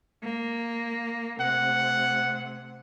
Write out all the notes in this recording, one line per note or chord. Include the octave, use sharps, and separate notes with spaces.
A#3
C3 A3 F#5